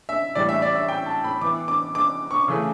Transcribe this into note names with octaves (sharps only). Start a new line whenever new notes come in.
E5
A2 E3 G3 D5
E5
D5
E5
G5
A5
B5
E3 B3 E4 D6
D6
D6
C#6
C#3 E3 A3